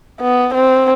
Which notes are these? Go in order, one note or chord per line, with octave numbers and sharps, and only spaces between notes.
B3
C4